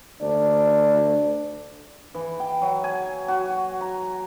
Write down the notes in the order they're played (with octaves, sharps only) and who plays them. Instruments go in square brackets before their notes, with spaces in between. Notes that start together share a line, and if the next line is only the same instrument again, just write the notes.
[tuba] D2 [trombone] D4
[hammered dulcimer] E3
G5
F#3
G#5
F#4
A#5